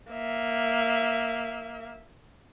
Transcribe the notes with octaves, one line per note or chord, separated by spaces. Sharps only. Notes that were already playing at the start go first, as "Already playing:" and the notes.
A#3 E5